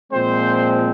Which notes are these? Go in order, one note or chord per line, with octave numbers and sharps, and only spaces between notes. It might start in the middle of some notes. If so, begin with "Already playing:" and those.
A#2 F3 G#3 C4 C5